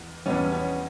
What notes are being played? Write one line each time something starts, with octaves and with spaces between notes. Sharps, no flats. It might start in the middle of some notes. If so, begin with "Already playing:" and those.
Already playing: E2
E2 B2 G3 B3 C#4
B3 C#4